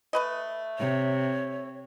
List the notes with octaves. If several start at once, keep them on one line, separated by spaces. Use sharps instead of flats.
A3 B4 D#5
C3 C#5